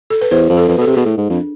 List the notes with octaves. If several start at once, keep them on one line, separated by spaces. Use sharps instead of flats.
A4
B4
E2 C5
F2
A4
F2 B4
B2
A4
C3
B2 G#4
A2
G#2
F2 D4